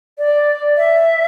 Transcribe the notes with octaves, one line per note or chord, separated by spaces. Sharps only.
D5
E5